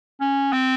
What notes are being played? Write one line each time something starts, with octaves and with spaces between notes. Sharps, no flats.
C#4
C4